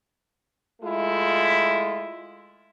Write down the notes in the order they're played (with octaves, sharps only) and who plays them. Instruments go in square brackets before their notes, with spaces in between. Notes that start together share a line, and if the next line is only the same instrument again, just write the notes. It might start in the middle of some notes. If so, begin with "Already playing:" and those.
[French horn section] G#3 A3 E4 F4